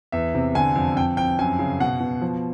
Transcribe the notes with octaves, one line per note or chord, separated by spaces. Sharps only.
E2 E5
C3
D3 G#5
F2
F2 G5
F2 G5
F#2 G#5
C#3
B2 F#5
B2
F3